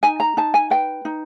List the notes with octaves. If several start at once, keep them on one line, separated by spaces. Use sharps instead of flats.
D#4 G#5
A#5
D#4 A5
G#5
B4 G5
D#4